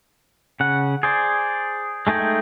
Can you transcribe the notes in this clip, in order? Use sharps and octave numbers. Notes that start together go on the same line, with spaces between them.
C#3 F#5
G#4 C5 D5
G#3 A3 D#4 G#4 G5